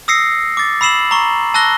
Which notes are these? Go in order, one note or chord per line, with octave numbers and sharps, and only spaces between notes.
D#6 E6 A#6 C7 C#7
D6 A6
B5 E6 C7 E7 F#7
A#5 C#6
A5 E6 F#6 A#6 G7